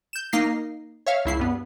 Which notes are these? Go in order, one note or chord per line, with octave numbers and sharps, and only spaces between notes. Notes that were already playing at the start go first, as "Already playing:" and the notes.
G6 E7
A#3 D#4 A#6 C7
C#5 E5 F5
C#2 E4 C7
G2 B3